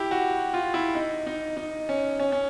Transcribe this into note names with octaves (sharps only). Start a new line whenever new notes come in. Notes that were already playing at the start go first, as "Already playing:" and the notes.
Already playing: E4 G4
F#4
F4
E4
D#4
D#4
D#4
C#4
C#4
C#4